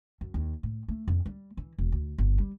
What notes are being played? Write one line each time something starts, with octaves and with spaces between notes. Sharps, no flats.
F#2
D#2
A2
A3
F2
G3
E3
E1
D2
G1
G3